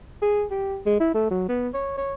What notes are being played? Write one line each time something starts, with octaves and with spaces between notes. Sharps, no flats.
G#4
G4
G#3
E4
A3
F#3
B3
C#5
C#5